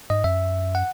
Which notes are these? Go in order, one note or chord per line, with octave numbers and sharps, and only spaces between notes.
G#2 D#5
F#2 E5
F#5